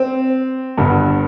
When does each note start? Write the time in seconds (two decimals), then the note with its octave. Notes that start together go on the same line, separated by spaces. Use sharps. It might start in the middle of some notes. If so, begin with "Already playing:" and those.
Already playing: C4
0.78 G1 G2 D3